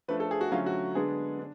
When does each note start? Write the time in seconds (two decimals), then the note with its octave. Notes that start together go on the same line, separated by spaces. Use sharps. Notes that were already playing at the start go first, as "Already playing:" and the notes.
0.08 F3 A3 D4 B4
0.20 A4
0.31 G#4
0.41 F#4
0.52 D3 F#3 A3 C#4 F4
0.66 F#4
0.95 D3 G#3 B3 D4 G#4
1.39 D4